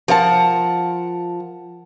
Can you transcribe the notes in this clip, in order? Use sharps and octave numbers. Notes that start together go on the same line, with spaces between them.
F3 A#4 F#5 A5